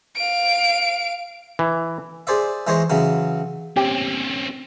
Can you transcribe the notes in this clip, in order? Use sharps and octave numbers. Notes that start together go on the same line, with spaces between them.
F5 D7
E3
G#4 C5 D5 E5
E3 G#3 C5 C#5 D#5
C#3 E3 F#3
C4 C#4 G4